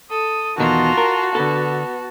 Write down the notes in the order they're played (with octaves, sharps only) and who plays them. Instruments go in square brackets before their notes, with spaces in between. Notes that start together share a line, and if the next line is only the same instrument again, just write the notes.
[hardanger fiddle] A4 [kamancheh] D#6
[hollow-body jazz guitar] E2 B2 D#3 [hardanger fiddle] F4 A#5 [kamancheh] F#4 A5
[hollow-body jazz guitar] A#4
[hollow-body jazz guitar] D3 A4 [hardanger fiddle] B3